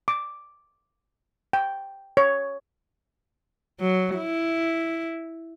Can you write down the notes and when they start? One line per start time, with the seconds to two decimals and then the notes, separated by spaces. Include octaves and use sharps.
0.08 D6
1.53 G5
2.17 C#5
3.80 F#3
4.16 E4